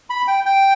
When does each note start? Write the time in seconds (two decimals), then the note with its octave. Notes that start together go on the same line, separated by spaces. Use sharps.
0.10 B5
0.28 G5
0.46 G5